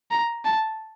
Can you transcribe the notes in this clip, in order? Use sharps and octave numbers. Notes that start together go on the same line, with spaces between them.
A#5
A5